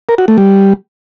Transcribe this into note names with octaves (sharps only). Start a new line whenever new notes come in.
A#4
F#4
A3
G3